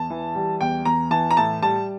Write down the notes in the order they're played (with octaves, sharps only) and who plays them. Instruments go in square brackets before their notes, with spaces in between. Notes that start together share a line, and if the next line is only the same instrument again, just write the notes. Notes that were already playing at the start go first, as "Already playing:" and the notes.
Already playing: [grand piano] E2 A5
E3
G3
E2 G5
E2 A#5
E3 A5
A#5
A2 A5
G3 A5